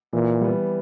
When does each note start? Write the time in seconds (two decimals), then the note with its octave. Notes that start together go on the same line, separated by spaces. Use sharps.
0.13 A#2 E3
0.41 G3 B3